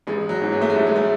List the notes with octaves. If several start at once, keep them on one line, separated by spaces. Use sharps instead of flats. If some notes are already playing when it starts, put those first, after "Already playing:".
A1 G#3
F#3
G#2 E3
G#3
A3
G#3
A1 A3
G#3
A3